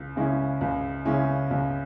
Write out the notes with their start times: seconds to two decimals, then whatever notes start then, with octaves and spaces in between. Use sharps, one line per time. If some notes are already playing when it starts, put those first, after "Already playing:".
Already playing: C#2
0.16 C#3 G#3 C#4 E4
0.61 C#2
1.05 C#3 G#3 C#4 E4
1.51 C#2